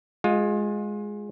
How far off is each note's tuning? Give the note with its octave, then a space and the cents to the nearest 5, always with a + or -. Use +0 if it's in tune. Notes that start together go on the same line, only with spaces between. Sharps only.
G#3 +0 F4 +25